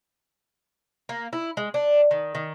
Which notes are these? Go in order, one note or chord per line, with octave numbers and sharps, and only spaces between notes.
A#3
E4
G#3
D4
D#3
D#3